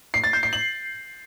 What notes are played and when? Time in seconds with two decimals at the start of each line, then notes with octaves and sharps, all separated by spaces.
0.14 C7
0.24 A6
0.33 G6
0.43 C7
0.53 F#7